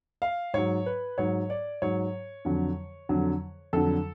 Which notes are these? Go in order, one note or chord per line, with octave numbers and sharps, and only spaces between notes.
F5
G#2 F#3 C#5
B4
G#2 F#3 C#5
D5
G#2 F#3 C#5
F2 D3 F#3
F2 D3 F#3
F2 D3 F#3 A4